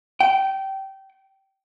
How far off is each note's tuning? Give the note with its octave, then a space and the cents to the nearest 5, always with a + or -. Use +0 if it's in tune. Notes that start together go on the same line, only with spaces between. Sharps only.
G5 -20